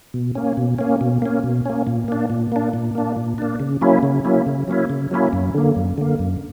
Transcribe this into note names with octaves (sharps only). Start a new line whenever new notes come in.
B2
A#3 C#4
B2
A#3 C#4
B2
A#3 C#4
B2
A#3 C#4
A#2
A#3 D4
A#2
A#3 D4
A#2
A#3 D4
A#2
A#3 D4
C#3
F#3 A#3 C#4 E4
C#3
F#3 A#3 C#4 E4
C#3
F#3 A#3 C#4 E4
C#3
F#3 A#3 C#4 E4
F#2
D3 A#3
F#2
D3 A#3
F#2